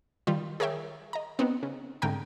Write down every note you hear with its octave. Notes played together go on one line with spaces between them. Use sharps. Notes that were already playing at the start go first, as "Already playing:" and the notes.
D#3 G3 F4
G#4 A#4 C#5 E5 G5
D#5 A#5
B3 C4 D4 D#4
C#3
C2 G#2 D3 A#4 G5 A#5